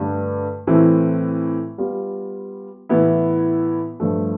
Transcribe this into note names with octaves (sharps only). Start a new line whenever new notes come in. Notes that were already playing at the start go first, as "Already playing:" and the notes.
Already playing: G2 D3 A3 D4 G4
A2 E3 A3 C4
G3 B3 F4
A2 E3 B3 E4
G2 F3 A3